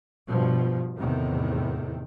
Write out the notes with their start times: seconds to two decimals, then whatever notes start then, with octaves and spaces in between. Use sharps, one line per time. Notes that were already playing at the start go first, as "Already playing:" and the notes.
0.28 G2 B2 F3
0.96 E2 A2 C3 D#3